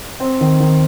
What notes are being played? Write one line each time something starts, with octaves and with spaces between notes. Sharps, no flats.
C4
D#3
D#3